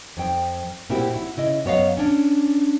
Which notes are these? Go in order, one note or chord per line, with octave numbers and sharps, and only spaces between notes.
F2 G5
A#2 A#3 C4 E4 F#4 G4
E4 F#4
C#3 E4 D#5
F#2 B3 C#5 D#5 F5
C#4 D4